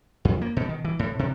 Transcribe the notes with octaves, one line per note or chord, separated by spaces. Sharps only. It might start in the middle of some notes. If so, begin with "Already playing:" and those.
F2
A#3
B2
D#3
E3
A2
C3